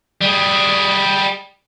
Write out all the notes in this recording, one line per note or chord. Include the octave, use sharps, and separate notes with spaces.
G3 G#4